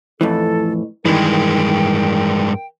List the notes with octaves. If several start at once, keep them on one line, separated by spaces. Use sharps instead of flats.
F2 A2 E3 E4 A4
G2 D#3 E3 G#3 A#4 G5